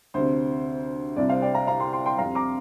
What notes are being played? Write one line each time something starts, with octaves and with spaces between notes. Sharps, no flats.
D2 C3 C5
C2 C3 D5
C5 F5
D5 G5
F5 A#5
F5 A#5
G5 C6
G5 C6
G5 C6
F2 C3 F5 A#5
A#5 D6